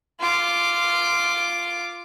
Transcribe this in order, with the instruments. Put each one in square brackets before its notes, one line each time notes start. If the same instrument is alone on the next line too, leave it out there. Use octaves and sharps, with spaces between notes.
[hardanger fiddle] F4 D6